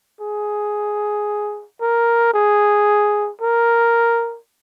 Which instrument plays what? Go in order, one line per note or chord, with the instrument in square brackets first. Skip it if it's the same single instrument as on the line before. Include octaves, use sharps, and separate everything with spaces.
[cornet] G#4
A#4
G#4
A#4